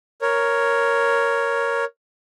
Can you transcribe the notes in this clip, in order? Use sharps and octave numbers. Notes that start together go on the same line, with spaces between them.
A#4 C#5